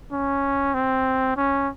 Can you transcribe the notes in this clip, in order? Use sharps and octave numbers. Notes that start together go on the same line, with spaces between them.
C#4
C4
C#4